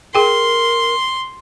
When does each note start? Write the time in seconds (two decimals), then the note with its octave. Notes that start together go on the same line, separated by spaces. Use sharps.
0.15 G#4 A#4 G5 C6